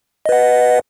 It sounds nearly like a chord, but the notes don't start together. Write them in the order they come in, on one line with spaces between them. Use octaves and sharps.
D#5 B4 F#5